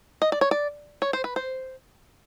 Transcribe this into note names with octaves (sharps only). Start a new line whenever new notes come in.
D#5
D5
C#5
D5
C#5
C5
B4
C5